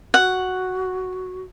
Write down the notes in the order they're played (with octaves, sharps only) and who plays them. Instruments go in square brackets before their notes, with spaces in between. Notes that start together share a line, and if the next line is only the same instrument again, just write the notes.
[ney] F#4 [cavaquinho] F#5